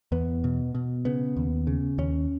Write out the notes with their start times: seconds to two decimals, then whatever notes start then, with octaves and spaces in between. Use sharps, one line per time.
0.12 E2 B3
0.44 B2
0.75 B2
1.05 C#3 B3
1.36 D#2
1.67 C#3
1.98 D#2 C#4